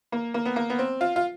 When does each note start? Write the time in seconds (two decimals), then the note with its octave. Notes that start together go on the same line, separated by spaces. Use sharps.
0.12 A#3
0.34 A#3
0.45 B3
0.56 A#3
0.70 B3
0.79 C4
1.01 F4
1.16 F4